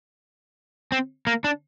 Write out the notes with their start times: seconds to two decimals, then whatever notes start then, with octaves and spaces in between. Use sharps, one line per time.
0.92 C4
1.27 A#3
1.44 D4